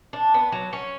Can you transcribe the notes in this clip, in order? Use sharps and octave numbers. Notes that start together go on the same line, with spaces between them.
D4
B3
F#3
C#4